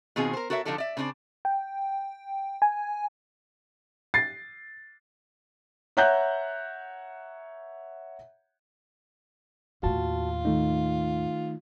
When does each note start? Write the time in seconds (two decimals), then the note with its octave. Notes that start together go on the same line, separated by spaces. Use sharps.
0.16 B2 D#3 C4 F4 G#4
0.33 A#4 C5
0.50 F#4 A4 A#4 C#5 E5
0.65 D3 F3 D#4 G4 A4 D5
0.78 D5 E5
0.97 C#3 C4 D4 D#4 D5
1.45 G5
2.62 G#5
4.14 A6 C7
5.97 C#5 E5 F#5 A#5 F#6 G6
9.83 D#2 A2 F4 F#4 A5
10.45 D#3 A3 D#4